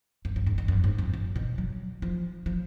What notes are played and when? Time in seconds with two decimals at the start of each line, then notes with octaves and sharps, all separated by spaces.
0.25 F#2
0.36 F#2
0.46 G#2
0.58 F#2
0.68 F#2
0.84 G#2
0.98 F2
1.14 F#2
1.36 B2
1.58 F#3
2.02 F3
2.46 F3